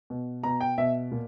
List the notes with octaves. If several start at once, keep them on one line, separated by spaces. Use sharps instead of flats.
B2
B2 A#5
G5
B2 E5
A#2